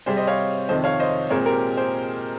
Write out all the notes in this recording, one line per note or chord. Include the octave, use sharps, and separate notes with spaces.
C3 G3 C4 G#4 C5
C5 D#5
C#5 F5
F2 C3 D#3 C5 D#5
C#5 F5
C5 D#5
A#2 G#3 C4 A#4 C#5
G4 A#4
G#4 C5